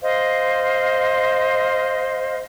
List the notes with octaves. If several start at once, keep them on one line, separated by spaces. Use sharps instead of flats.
C5 D#5 F5